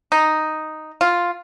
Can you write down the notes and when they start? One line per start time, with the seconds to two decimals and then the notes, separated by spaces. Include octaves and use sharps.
0.12 D#4
1.01 F4